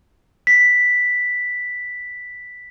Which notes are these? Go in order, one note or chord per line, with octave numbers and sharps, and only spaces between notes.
A#6 B6